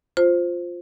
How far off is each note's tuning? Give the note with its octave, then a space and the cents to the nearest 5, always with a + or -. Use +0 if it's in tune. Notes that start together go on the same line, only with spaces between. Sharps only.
F4 +5 C5 +0